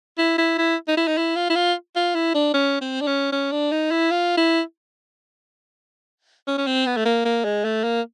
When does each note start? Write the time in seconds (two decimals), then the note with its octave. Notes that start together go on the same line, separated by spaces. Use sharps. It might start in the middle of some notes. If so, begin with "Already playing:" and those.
0.18 E4
0.38 E4
0.58 E4
0.88 D#4
0.97 E4
1.07 D#4
1.17 E4
1.36 F4
1.50 E4
1.55 F4
1.96 F4
2.15 E4
2.34 D4
2.54 C#4
2.81 C4
3.01 D4
3.07 C#4
3.32 C#4
3.52 D4
3.72 D#4
3.91 E4
4.11 F4
4.37 E4
6.47 C#4
6.58 C#4
6.67 C4
6.86 B3
6.97 A3
7.05 A#3
7.25 A#3
7.44 G#3
7.64 A3
7.84 A#3